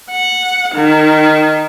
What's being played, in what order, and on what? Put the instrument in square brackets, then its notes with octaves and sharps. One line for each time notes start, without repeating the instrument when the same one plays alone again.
[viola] F#5
D#3